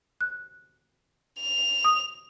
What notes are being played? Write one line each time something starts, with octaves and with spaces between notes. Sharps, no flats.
F#6
F7
D#6